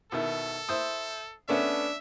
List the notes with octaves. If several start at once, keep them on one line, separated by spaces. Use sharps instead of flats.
B2 D#3 E4 A4
E4 C5 D#6
A3 B3 C#4 D4 E5